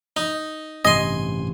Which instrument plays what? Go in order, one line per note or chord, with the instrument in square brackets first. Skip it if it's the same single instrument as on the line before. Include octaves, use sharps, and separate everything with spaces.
[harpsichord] D#4
[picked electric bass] A1 G2 C3 [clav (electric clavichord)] D#5 [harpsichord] G#5 C6